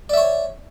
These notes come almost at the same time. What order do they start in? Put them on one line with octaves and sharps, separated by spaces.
D5 E5 C#5